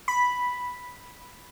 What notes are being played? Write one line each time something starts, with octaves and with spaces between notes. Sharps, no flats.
B5